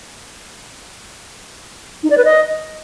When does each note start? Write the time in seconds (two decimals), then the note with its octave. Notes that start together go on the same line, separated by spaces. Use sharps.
2.03 D#4
2.10 D5
2.18 B4
2.25 D#5